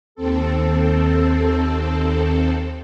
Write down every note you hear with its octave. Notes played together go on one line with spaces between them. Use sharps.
D#2 C4 A4